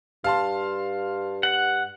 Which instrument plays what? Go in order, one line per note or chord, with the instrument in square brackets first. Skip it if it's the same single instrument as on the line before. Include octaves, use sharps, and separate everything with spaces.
[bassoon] G2 [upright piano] F5 A5 C6
[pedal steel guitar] F#5